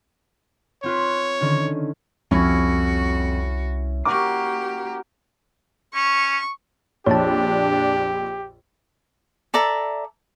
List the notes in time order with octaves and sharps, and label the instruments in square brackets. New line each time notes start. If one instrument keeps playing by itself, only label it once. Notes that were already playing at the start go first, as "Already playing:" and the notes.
[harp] C4 F4 B4 [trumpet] C#5
[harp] D3 D#3 C#4
[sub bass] C2 [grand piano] F2 [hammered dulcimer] C#4 E4 [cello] F#4
[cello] A#3 G4 [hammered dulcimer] F#4 A#4 [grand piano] D6
[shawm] C#4 [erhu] C#6
[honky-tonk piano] A#1 F2 [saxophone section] D4 [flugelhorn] G4 [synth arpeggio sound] C#5 A5
[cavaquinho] A4 D5 E5 A#5